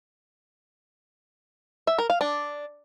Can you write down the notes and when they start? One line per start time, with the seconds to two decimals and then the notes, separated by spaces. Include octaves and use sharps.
1.87 E5
1.98 A#4
2.10 F5
2.21 D4